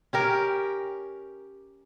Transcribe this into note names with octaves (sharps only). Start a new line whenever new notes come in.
C#4 G4 A#4